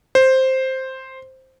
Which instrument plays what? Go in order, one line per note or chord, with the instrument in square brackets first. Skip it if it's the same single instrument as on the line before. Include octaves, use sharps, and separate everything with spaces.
[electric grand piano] C5